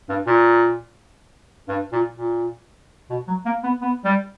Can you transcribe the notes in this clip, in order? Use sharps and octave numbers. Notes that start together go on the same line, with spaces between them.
G2
A#2
G2
A#2
A#2
B2
F#3
A#3
B3
B3
G3